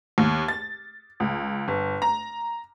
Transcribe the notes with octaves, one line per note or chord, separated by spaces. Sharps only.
D#2
A6
C#2
G1
A#5